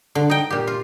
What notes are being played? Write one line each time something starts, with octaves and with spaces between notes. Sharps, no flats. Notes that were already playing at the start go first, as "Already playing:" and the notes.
D3
D#4 G5
A#2 G4
F4